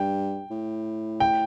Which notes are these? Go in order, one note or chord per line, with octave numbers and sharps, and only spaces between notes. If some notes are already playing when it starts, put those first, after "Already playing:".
Already playing: G2 G5
A2
G5